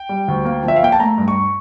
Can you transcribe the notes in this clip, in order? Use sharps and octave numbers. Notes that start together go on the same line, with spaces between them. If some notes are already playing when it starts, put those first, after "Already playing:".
Already playing: G5
G3
D2
A#3
F3 E5
F5
A#3 G5
A5
A3 A#5
G2
C#6